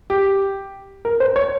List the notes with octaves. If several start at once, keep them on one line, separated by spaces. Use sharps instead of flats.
G4
A#4
C5
C#5